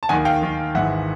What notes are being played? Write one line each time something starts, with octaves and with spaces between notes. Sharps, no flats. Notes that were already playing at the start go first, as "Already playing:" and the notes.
A5
D#2 D#3 F#5 G#5
F5 G5
D#2 D#3
G#1 G#2 E3 E5 F#5